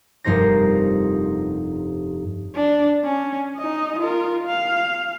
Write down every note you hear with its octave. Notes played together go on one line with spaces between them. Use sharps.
F1 G2 D#4 A#4 C5 A#6
D4
C#4
D#4 D#5
F4 A#4
F5